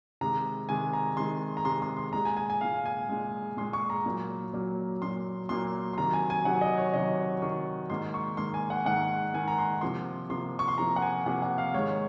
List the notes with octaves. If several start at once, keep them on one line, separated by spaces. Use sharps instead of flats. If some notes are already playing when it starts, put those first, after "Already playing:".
C3 D#3 G#3 A#5
C3 D#3 G#3 G#5
A#5
C3 D#3 G#3 C6
A#5
C3 D#3 G#3 C6
C6
C6
A#2 G#3 A#5
G#5
G#5
G#5
A#2 G#3 F5
G#5
A#2 G#3
A#2 G#3 C6
C#6
A#5
A#2 F#3 A#3
A#2 F#3 A#3
A#2 F#3 A#3 C6
A#2 F#3 A#3 C6
C6
C3 D#3 F#3 A#5
G#5
G#5
C3 D#3 F#3 F#5
D#5
C#5
C3 D#3 F#3 D#5
C3 D#3 F#3 C#6
G#2 D#3 A#3 C6
C#6
G#2 D#3 A#3 C6
G#5
F#5
G#2 D#3 A#3 F#5
G#2 D#3 A#3 G#5
A#5
C6
C3 F3 A#3 C6
C3 F3 A#3 C6
C#6
C6
C3 F3 A#3 A#5
F#5
G#5
C3 F3 A#3 F#5
F#5
F5
G#2 D#3 G#3 C#5